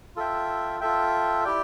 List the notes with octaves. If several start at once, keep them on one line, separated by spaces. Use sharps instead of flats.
F4 A4 E5 G5
F4 A4 E5 G5
E4 G4 D5 G5